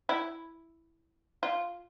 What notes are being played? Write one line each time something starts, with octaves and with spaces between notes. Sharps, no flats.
E4
F4